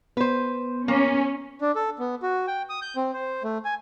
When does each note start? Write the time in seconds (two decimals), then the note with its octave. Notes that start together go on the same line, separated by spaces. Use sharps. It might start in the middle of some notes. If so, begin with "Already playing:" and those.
0.17 B3 B4 C5
0.88 A#3 C#4
1.61 D4
1.75 A4
1.99 B3
2.23 F#4
2.47 G5
2.69 D#6
2.82 G6
2.96 C4
3.13 C5
3.44 A3
3.65 G#5